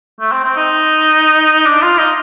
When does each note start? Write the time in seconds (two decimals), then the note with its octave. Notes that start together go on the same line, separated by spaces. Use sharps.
0.20 A3
0.32 C4
0.44 C4
0.56 D#4
1.66 D4
1.82 F4
1.98 D#4